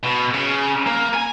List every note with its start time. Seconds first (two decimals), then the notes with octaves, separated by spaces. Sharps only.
0.04 B2
0.34 C#3
0.86 A#3
1.13 G#5